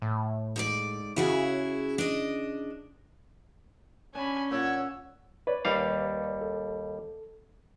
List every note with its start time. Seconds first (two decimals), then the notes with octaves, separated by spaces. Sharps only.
0.02 A2
0.56 G#2 A4 D5
1.16 C#3 E4 F#4 G#4
1.98 D4 D#5
4.15 C#4 D4 G#5 B5
4.51 A#2 C#5 D5 F#5 E6
5.47 B4 C#5 D5
5.65 D#2 G3 F5
6.41 A4